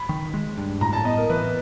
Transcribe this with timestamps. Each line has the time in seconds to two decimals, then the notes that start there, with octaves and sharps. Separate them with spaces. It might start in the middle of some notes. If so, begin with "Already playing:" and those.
Already playing: B5
0.09 D#3
0.34 G#3
0.58 G2
0.81 A2 A#5
0.93 A5
1.05 B3 D#5
1.17 A#4
1.30 E3 B4